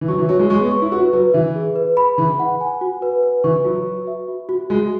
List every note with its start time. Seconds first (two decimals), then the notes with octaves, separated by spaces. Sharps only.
0.01 E3
0.08 F#3 C#6
0.18 E3
0.29 F#3 C#5
0.39 G#3
0.50 G#3 C#6
0.61 B3
0.72 C#6
0.82 E4
0.92 F#4 B4
1.13 F#3 B4
1.34 E3 E5
1.55 G#4
1.76 B4
1.97 B5
2.17 E3 B4
2.39 F#5
2.61 G#5
2.81 F#4
3.02 B4
3.23 B4
3.44 E3 C#6
3.65 F#3 F#4
3.86 F#4
4.07 E5
4.28 F#4
4.49 F#4
4.70 G#3 F#4